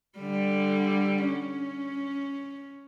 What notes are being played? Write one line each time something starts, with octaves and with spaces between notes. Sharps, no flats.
D3 G3
C#4